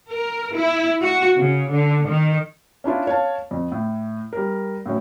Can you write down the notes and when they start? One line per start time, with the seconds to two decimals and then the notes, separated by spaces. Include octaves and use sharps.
0.12 A#4
0.54 E4
1.01 F#4
1.38 C#3
1.70 D3
2.07 D#3
2.84 C#4 D4 E4 F4
3.07 C#5 F5 A5
3.51 F2
3.72 A2
4.33 G3 A#4
4.86 A2 F#3 C#4